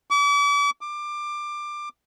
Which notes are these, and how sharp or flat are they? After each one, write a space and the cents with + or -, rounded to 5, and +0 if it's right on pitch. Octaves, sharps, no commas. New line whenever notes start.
D6 -40
D6 +20